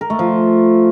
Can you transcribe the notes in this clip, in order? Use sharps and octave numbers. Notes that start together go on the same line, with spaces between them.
A#4
A3
F3